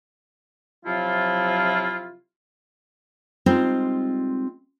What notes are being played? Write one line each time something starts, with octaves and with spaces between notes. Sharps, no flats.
C3 F3 F#3 E4 F4
G3 G#3 C4 D#4 F4 C5